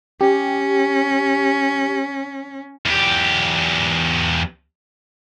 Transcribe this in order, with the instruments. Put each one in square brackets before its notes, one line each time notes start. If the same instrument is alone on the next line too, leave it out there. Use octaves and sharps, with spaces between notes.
[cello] C#4 [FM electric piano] G4
[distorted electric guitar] E2 G4